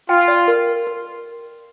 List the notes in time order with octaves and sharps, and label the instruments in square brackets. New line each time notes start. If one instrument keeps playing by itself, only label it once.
[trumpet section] F4 [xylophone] G5
[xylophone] D5
A#4
A#4
A#4